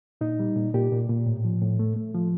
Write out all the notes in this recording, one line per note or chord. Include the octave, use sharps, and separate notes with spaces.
A#2 D#4
G3
A#2
A#2 G4
A#2
A#2
A2
F3
A2
A3
A3
F3